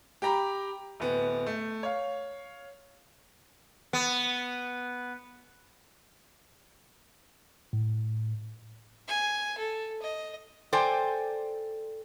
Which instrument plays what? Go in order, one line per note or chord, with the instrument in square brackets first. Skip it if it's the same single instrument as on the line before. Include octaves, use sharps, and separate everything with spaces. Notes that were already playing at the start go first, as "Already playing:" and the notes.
[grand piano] G4 G5 A#5 B5
D1 B3
A3
C#5 F5
[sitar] B3
[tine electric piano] A2
[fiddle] G#5
A4
D#5
[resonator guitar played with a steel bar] A4 C5 D5 G5 G#5